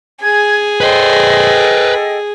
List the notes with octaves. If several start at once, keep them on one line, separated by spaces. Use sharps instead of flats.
G#4 G#5 G#6
A4 B4 C5 D#5 G5